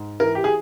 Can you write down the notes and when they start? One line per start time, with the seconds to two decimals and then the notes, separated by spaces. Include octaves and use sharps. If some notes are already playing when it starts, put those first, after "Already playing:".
Already playing: G#2
0.20 E3 A#4
0.35 G4
0.44 G#4